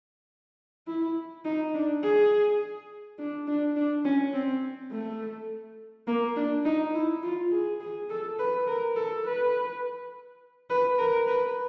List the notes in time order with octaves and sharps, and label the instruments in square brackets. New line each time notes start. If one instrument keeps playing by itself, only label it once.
[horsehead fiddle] E4
D#4
D4
G#4
D4
D4
D4
C#4
C4
A3
A#3
D4
D#4
E4
F4
G#4
G#4
A4
B4
A#4
A4
B4
B4
A#4
B4